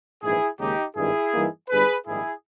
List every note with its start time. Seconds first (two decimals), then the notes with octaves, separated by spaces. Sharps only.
0.23 A#1 G#2 E3 E4 G#4
0.59 D#2 C#3 G#3 D#4 G4
0.96 G#1 G2 D#3 E4 G#4
1.33 G2 E3 G3 A#3 D#4
1.69 G1 G2 G3 G#4 B4
2.07 A#1 G#2 D#3 G3 E4 G#4